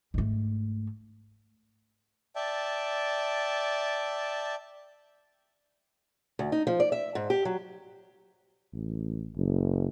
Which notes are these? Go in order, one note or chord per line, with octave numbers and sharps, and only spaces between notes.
G#2 A3
D5 E5 G5 A5
D2
D#4
F3
D5
E5
G#2
G4
F#3
A1
F#1